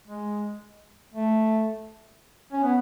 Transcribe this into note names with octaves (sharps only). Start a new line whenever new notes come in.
G#3
A3
C#4
B3